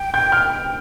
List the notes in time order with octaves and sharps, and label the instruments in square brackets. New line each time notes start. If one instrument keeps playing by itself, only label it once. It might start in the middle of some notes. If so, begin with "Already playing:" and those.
Already playing: [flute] G5
[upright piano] G6
F6